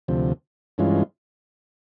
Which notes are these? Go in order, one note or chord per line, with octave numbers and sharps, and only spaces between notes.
D2 C3 F3
G2 E3 G#3 C#4 F4